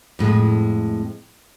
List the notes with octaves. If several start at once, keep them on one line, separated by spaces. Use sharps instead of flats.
F2 A2 G#3